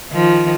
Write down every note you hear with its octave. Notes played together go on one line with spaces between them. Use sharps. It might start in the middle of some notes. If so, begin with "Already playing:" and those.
D#3 F3